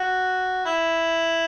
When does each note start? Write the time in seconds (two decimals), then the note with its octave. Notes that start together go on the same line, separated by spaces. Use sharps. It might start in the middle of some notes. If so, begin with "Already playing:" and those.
Already playing: F#4
0.65 E4